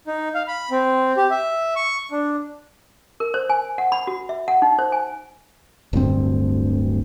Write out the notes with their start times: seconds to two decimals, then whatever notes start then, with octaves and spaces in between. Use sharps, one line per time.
0.07 D#4
0.35 F5
0.47 B5
0.71 C4
1.17 G4
1.31 E5
1.76 C#6
2.11 D4
3.20 A#4
3.34 C5
3.50 G#5
3.78 F#5
3.92 B5
4.07 F#4
4.29 E5
4.48 F#5
4.62 D#4
4.79 C5
4.92 G#5
5.93 D1 D2 G2 C4